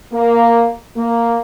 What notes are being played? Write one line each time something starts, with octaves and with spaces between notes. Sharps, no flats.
A#3
A#3